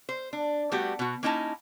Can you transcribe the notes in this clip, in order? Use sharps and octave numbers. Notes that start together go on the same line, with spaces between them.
C5
D4
G3 A3 B3 F#4 G4
B2 F#4
A#3 C#4 D#4 E4 D#5 A5